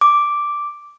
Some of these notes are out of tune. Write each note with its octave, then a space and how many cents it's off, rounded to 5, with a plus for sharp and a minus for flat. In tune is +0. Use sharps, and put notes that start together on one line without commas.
D6 -5